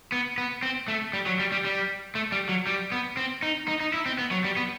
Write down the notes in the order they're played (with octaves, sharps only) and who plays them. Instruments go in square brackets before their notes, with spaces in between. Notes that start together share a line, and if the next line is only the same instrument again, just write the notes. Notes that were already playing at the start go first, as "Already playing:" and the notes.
[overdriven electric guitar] B3
B3
C4
A3
G3
F#3
G3
G3
G3
A3
G3
F#3
G3
B3
C4
D#4
D#4
D#4
E4
C4
B3
F#3
G3
B3